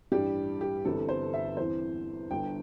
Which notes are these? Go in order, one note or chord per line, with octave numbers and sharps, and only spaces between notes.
A1 G2 G3 D4 G4
G4
G1 G2 E3 G3 C4 A4
C5
E5
E2 E3 C4 C5
G1 G2 D3 G5